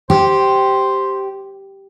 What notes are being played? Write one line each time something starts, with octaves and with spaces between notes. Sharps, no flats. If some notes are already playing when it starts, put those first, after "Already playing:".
G4 C5